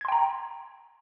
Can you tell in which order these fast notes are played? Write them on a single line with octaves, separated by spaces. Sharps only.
G#6 C6 G5 A#5